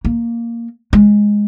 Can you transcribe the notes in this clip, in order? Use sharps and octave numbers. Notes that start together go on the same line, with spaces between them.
A#3
G#3